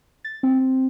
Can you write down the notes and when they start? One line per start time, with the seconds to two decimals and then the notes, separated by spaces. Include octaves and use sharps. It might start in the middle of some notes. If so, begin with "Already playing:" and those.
0.25 A6
0.43 C4